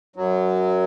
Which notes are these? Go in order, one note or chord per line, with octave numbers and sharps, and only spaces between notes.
F#2 F#3